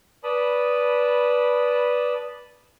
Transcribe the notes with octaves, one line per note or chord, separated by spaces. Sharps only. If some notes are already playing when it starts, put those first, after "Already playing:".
B4 D5 A5 B5 D#6